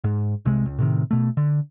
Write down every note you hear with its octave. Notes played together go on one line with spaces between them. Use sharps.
G#2
C2 C3 G#3
C#2
A2 C3 D#3
B2 A3
D3